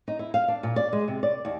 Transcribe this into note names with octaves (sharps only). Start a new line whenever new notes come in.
D#4
E4
F5
D4
A#2
D5
G#3
C3
D5
D#2